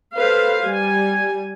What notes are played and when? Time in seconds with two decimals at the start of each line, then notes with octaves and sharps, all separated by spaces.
0.16 A4 B4 C5 F5
0.64 G3 G#5